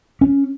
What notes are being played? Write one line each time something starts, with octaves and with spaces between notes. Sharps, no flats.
C#4